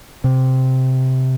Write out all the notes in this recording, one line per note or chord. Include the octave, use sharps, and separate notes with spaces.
C3